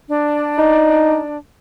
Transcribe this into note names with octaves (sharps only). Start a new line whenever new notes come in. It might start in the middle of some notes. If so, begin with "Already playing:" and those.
D4
D#4